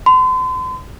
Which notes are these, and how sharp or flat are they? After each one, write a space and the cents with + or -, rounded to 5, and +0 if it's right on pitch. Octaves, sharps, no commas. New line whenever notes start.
C6 -40